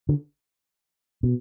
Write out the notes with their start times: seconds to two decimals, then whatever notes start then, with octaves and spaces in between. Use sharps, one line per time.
0.09 D3
1.23 B2